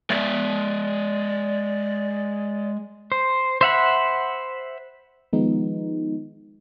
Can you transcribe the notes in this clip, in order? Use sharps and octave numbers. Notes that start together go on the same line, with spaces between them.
G#3 D5 E5
C5
C5 E5 F#5 B5
D#3 F3 G#3 B3 D#4